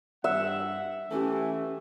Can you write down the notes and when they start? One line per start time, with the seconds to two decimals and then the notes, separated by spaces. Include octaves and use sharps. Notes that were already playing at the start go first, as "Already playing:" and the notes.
0.24 G2 E5 F#5
1.11 E3 A3 C#4 G4 A4